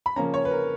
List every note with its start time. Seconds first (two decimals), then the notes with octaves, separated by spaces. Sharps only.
0.06 B5
0.16 C#3 F3 A#3 C#4 A#5
0.34 C#5
0.45 B4
0.51 A#4